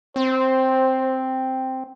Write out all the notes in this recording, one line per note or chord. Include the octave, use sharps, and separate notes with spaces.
C4 C5